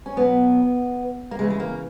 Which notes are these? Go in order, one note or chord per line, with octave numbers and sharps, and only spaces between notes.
C#4
B2 F#3 B3
A#3
C#3 E3 G#3
G#3
A#3